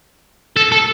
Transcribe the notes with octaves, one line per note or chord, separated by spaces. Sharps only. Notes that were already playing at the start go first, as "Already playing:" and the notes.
A4
A4